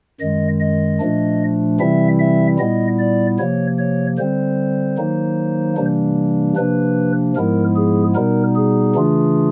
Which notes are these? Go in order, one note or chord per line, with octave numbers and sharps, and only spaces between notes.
F#2 D#3 G#3 D#5
D#5
A#2 F3 A3 D4
C3 E3 G3 C4 E4 E5
E5
A#2 G3 B3 E4 D#5
D5
C3 F3 A#3 C#5
C#5
D3 G3 C4 C5
D#3 F#3 A#3 D#4
C3 E3 G3 A#3 D4
C3 F3 A#3 D4 B4
G#2 F3 G#3 B3 E4 A#4
G#4
B2 G3 B3 D#4 A#4
G#4
C#3 E3 A3 D4 F4